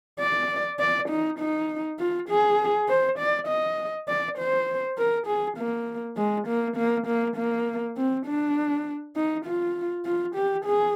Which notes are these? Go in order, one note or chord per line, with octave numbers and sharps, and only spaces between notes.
D5
D5
D#4
D#4
F4
G#4
C5
D5
D#5
D5
C5
A#4
G#4
A#3
G#3
A#3
A#3
A#3
A#3
C4
D4
D#4
F4
F4
G4
G#4